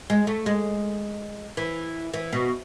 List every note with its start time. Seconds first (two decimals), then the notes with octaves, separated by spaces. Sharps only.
0.10 G#3
0.27 A3
0.46 G#3
1.57 E3
2.13 E3
2.32 B2